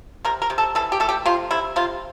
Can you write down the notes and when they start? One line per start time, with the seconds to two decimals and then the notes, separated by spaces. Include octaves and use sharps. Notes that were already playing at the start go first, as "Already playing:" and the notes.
0.25 C3 A#4
0.42 A#4
0.50 C3
0.58 A4
0.75 E3 A4
0.92 G4
1.00 A3 A4
1.09 G4
1.26 C3 F4
1.51 C3 E4
1.76 C3 F4